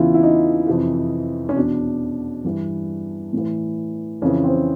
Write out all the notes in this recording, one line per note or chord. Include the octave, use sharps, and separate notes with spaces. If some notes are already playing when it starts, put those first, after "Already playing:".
Already playing: E2 C#3 E3 E4 F4
E4
D#4
F2 C3 E3
C#4
E2 B2 D4
G2 E3
A2 E3
F2 C#3 E3 C#4
C4